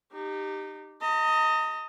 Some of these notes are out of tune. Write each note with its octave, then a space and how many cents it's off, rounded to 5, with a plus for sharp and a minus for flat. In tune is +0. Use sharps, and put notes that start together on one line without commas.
D#4 -20 G4 +5
D#5 +10 A#5 -40